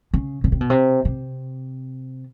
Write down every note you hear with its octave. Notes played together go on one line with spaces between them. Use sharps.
C#3
C#3
C3
B2
C3
C3